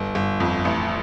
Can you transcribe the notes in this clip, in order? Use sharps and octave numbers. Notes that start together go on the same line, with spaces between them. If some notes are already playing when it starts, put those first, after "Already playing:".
Already playing: G1
G1
F2
A1